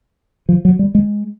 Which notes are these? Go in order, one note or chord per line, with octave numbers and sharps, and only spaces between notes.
F3
F#3
G3
G#3